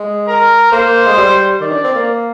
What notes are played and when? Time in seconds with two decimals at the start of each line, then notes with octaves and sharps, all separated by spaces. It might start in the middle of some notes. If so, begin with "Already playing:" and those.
Already playing: G#3
0.28 A#4
0.72 A#3 C5
1.06 G#3
1.17 G3
1.61 D#3 D5
1.72 D4
1.84 C4
1.95 A#3